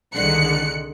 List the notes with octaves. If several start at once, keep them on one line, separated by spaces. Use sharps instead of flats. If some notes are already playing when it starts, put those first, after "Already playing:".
C2 D3 D#3 G#3 F#6 C#7